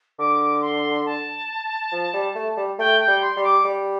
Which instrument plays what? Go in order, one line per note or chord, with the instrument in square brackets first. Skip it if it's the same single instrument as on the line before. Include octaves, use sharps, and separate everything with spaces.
[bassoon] D3 [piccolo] D6
[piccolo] C6
A5
[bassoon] F3
G3
A3
G3
[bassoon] A3 [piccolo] G5
[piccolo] G5
[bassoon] G3
[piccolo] C6
[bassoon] G3
[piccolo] D6
[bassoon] G3